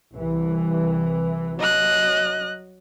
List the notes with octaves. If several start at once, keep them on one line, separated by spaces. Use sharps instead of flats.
C2 E3
F#3 D#5 F#6